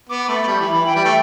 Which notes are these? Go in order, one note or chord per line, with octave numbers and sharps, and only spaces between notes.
B3 D6
A3 B5
A3
G3
E3
E3
E3 G5
G3
A3